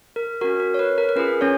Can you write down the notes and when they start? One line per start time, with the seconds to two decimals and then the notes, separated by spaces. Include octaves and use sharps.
0.16 A#4
0.41 C#4 F#4 A#4
0.60 A#4
0.74 C#5
0.79 B4
0.98 A#4
1.09 A#4
1.16 C#4 F4 G#4 B4
1.41 C#4 C#5